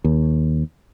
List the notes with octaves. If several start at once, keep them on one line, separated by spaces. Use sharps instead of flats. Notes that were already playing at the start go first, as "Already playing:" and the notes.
D#2